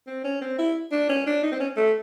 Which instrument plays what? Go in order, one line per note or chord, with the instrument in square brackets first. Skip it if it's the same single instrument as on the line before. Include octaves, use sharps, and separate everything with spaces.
[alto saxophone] C4
C#4
C4
E4
D4
C#4
D4
D#4
C4
C#4
A3